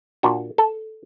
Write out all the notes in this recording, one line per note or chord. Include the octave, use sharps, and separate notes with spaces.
A#2 D4 F#4
A4